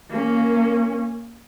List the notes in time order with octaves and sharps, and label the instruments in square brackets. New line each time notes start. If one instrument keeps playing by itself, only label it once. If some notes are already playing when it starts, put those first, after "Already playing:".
[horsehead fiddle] A#3 C#4